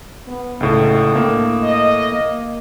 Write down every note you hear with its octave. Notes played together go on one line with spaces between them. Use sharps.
B3
C#2 A2 D3
A2 A#3
D#5
A#3